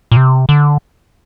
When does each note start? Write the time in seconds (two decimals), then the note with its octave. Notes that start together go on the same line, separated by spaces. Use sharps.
0.12 A#2
0.17 C3
0.49 D3